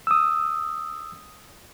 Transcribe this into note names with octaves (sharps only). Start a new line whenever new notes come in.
D#6 E6